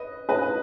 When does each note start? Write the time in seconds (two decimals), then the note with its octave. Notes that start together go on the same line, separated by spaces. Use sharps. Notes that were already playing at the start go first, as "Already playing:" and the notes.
Already playing: B4 D#5
0.29 B4 D#5